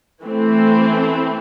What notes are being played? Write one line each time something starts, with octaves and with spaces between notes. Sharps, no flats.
E3 A3 C4